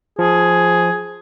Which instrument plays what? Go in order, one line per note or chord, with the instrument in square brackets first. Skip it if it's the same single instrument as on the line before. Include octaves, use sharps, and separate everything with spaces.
[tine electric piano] F3 [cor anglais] G#4